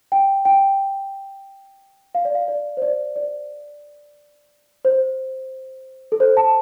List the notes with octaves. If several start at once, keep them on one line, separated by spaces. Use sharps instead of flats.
G5
G5
F5
D5
F5
D5
C5
D5
D5
C5
A4
C5
A5